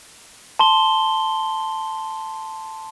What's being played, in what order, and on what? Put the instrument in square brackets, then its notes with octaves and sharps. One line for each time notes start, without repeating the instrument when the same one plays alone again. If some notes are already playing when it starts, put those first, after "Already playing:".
[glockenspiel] A5 C6 G7